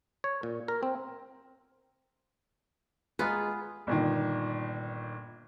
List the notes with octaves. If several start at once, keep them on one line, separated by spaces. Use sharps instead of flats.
C#5
A#2
A#4
C4
G#3 B3 F4 G#4 B4 A#5
G1 A#2 D#3